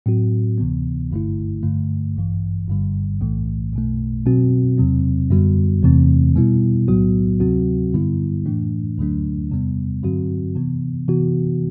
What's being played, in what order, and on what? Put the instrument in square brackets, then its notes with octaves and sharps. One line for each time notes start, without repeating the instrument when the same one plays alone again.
[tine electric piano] A2 F#3 C4 F#4
D2 C3 E3 B3
G1 G2 D3 A3 E4
G2 D3 A3
A1 G2 E3
G1 G2 D3 G3
B1 A2 E3 A3
B1 B2 A3
B2 F#3 C4 F#4
E2 C3 F#3 C4
F#2 D3 G3 B3 F#4
E2 C3 E3 A3 C4
B2 G3 B3 E4
B1 A2 F#3 B3 F#4
D2 C3 F#3 C4 F#4
G2 D3 G3 B3 E4
A2 E3 A3 D4
D2 D3 F#3 A3 D4
E2 C3 G3 B3
G2 D3 F#3 C4 F#4
C3 E3 B3
C3 E3 B3 F#4